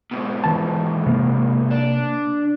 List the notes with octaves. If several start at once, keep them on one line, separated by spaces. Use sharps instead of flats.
G#2 B2
E3 A5
C3 A#3
D4